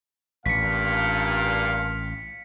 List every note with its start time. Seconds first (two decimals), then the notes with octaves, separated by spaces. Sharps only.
0.46 A1 G2 A#2 F5 B6 C#7